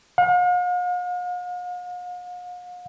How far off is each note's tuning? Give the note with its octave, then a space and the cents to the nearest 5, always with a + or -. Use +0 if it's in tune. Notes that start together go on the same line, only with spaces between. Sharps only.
F5 +45